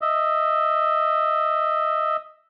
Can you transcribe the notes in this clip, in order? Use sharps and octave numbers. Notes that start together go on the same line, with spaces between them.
D#5 E5